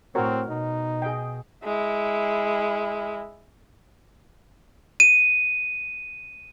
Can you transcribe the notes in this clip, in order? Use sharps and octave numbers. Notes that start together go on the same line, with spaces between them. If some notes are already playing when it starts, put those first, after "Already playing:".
A2 C4 F#4 A#4 C#5
B2 D#4
G#4 D#5 G5
G#3 E4
D#7